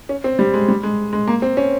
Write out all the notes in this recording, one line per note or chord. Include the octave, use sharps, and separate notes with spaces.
C#4
C4
G3
G#3
G3
G#3
G#3
A#3
C4
C#4